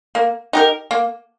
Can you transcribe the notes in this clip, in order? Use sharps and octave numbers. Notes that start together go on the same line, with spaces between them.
A#3
D#4 G4 A#4
A#3